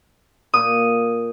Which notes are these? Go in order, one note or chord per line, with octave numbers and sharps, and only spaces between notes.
A#2 D#6